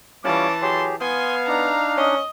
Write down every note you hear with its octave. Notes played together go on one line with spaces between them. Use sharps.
E3 G3 C#4 F4 C#5 A5 D6
F#3 G4 G#4 C6
B3 F5 G#5 C6 D#6
D4 D#4 A#5
C#4 D#5